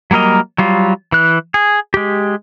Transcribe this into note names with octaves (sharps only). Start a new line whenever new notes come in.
F#3 G3 A#3 A#4 D#5
F#3 G3 F4
E3 F#6
G#4
G#3 G4